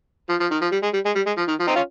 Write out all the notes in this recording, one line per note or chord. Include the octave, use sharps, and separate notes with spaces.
F3
F3
D#3
F3
G3
G#3
G3
G#3
G3
G#3
F3
D#3
F3
C4 D#4
C#4 F4